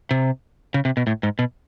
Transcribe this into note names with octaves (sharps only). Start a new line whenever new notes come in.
C3
C#3
C3
B2
A2
G#2
B2